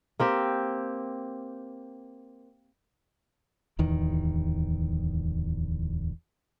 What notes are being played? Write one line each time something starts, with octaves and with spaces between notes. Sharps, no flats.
A#3 C4 G4
D1 E2 D#3